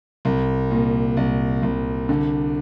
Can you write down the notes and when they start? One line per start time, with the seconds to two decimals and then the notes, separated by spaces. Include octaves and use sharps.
0.25 C2
0.71 A#2
1.17 C2
1.63 C2
2.09 D3